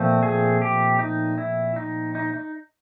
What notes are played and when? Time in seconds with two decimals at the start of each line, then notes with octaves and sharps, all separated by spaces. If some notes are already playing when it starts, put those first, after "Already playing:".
Already playing: A#2 F3 A3 C4
0.23 G#4
0.62 G4
0.99 D#4
1.38 E4
1.76 D#4
2.15 D#4
2.34 D#4